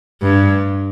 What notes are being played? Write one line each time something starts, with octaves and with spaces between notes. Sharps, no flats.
G2